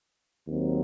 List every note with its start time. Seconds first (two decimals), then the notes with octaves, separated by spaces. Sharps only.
0.47 D#2 D#3 F#3 C4